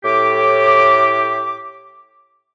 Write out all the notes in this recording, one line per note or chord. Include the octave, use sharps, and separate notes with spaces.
A2 G4 D6